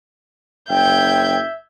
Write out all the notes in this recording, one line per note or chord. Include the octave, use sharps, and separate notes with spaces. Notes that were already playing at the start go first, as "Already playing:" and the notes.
F#1 E5 G5 G6 G#6